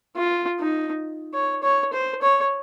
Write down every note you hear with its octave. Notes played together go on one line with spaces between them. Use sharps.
F4
D#4
C#5
C#5
C5
C#5